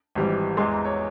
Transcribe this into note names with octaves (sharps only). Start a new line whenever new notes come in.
G#1 G#2 E3 G3
E2 E3 G#3 C6
A#5
C#5